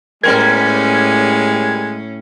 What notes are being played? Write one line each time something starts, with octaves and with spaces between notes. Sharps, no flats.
A2 G3 G#3 B3 C#4 A#4 G#6